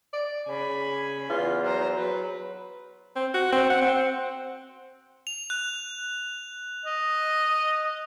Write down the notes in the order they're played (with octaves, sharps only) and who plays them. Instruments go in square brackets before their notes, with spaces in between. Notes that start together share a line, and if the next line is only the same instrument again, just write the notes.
[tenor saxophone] D5
[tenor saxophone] C#3 [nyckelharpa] G#5 B5
[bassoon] E2 [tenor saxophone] F4
[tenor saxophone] F#3 [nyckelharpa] C5 A#5
[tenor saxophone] F#3 [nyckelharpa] B4
[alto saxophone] C4
F#4
C4
F#5
C4
[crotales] F7
F#6
[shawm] D#5